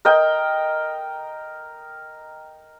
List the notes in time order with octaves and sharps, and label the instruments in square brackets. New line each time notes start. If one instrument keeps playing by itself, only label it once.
[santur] A#4 D#5 G5